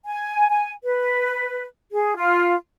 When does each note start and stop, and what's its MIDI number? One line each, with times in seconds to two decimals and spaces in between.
0.05 0.47 80
0.50 0.71 80
0.83 1.64 71
1.91 2.14 68
2.15 2.55 65